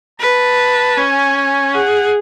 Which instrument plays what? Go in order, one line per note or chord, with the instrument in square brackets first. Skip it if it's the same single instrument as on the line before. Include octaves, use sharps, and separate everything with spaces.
[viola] B4 [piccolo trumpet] A5
[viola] C#4 [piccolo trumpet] G#5
[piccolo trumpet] G#5
[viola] G#4 [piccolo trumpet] F#5